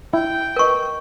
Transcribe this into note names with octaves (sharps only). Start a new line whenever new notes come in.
E4 G5
A#4 B4 D#5 C#6